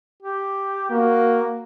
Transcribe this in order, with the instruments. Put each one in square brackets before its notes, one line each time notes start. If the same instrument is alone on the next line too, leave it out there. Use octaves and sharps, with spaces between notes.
[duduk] G4
[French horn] A#3 [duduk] F#4